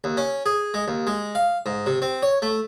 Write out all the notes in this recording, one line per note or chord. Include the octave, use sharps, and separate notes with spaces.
D#2
C#4
G#4
G#3
D#2
G#3
F5
G#2
C3
C4
C#5
A3